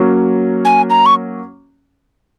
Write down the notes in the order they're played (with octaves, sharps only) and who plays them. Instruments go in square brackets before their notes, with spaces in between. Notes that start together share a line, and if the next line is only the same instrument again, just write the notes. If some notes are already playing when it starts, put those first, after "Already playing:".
Already playing: [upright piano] F#3 A#3 C#4
[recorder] G#5
A#5
C#6